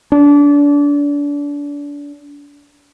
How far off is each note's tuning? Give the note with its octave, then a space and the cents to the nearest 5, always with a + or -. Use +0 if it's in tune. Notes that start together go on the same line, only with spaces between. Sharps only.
D4 -30